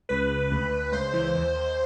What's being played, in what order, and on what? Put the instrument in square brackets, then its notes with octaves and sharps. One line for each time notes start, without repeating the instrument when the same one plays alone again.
[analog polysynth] C#2 B4
C#2
D2
D2
C#2 C5
E3
D#2
D#2